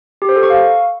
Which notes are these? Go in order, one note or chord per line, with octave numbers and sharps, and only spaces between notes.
G4
C5
A4
C#6
F5